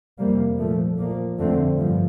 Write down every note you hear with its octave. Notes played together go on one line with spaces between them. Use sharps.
F2 C3 G3 A#3
A#2 F3 A3
A#2 F3 A#3
F2 D3 A3 C4
G2 F3